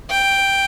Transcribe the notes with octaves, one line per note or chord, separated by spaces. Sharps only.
G5